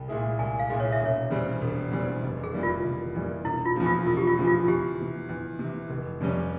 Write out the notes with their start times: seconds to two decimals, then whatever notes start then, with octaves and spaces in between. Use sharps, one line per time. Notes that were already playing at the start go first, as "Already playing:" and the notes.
Already playing: C2 G5
0.08 A#2 G#3 E4 G#4
0.39 C2 G#5
0.59 F5
0.70 A#2 G#3 E4 G#4
0.80 C#5
0.92 E5
1.00 E1
1.05 C#5
1.31 E2 C#3 G3 C4
1.61 E1
1.92 E2 C#3 G3 C4
2.22 F1
2.44 G#4
2.53 E2 E3 G3 A#3
2.63 F4
2.84 F1
3.14 E2 E3 G3 A#3
3.45 E1 E4
3.65 F4
3.76 E2 C#3 F3
3.86 F4
4.06 E1 F4
4.17 G4
4.27 F4
4.37 E2 C#3 F3
4.47 F4
4.68 E2 G4
4.99 C3 E3
5.29 E2
5.59 C3 E3
5.90 F1
6.20 F2 C3 G3 C#4